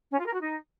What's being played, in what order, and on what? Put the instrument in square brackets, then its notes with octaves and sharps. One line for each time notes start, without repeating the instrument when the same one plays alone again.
[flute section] C#4
F4
A#4
F#4
D#4